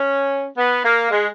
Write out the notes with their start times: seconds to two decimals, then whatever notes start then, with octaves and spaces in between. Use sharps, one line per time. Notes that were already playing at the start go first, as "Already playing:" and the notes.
Already playing: C#4
0.58 B3
0.84 A#3
1.11 G#3